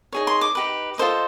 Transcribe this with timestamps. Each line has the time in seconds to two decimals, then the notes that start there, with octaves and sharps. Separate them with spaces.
0.12 D#4 G#4 C#5
0.27 C6
0.41 D6
0.55 D#4 G4 B4
0.98 F4 A4 C5 D#5